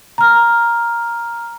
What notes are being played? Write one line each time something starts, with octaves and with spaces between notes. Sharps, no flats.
A#5 F6